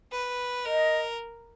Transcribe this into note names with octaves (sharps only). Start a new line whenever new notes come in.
B4
A#4 D#5